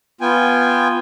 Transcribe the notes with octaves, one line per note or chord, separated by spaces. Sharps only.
B3 F4 G5 G#5